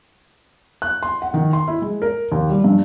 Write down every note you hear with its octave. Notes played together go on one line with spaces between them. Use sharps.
F#6
C6
F#5
D#3
C6
E4
G#3
A#4
D#2
G3
G2